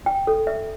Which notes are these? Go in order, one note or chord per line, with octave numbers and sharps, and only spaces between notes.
G5
A4
E5